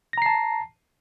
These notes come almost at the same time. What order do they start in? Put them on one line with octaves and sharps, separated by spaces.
A#6 A#5 C7 A5